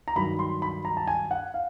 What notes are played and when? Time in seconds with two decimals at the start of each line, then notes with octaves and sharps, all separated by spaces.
0.08 A#5
0.16 G2 D#3 F#3 B5
0.39 C6
0.62 B5
0.85 A#5
0.97 A5
1.07 G#5
1.31 F#5
1.54 F5